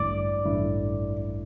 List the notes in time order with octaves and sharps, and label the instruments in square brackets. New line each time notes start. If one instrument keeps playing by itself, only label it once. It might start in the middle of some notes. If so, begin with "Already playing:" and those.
Already playing: [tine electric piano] A1 G2 D3 A3 E4 [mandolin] D5
[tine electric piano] A1 G2 D3 A3 E4